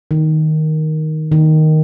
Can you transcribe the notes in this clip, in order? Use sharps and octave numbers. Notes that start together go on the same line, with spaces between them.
D#3
D#3